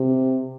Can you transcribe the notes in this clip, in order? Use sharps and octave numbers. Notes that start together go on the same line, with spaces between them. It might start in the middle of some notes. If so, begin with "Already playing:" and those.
Already playing: C3